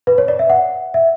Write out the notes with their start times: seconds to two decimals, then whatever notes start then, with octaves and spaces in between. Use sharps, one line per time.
0.07 B4
0.18 C#5
0.28 D5
0.39 E5
0.50 F#5
0.94 E5